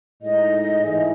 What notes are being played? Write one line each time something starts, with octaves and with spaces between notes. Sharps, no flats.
A2 G#3 D#4 D#5
G#2 E3 A3 E4 G#4